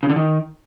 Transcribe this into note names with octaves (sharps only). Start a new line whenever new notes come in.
C#3
D3
D#3